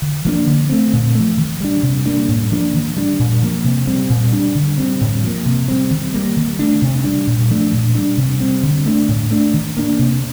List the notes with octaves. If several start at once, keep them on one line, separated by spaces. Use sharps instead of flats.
D3
F3 A#3 D4
D3
A3 C4
A#2
F3 A3
D#3
G3 D4
C3
G3 A#3 D4
A2
F3 A#3 D4
D#3
G3 D4
A#2
F3 A#3
C3
G3 C4
A#2
G3 D4
D3
G3 C4
A2
F3 A#3
C3
G3 C4
D#3
G3 A#3
D#3
A3 D4
C3
G3 D4
A#2
F3 A3 D4
A#2
G3 D4
C3
G3 C4
D3
A3 D4
A2
A3 D4
D#3
A#3 D4
C3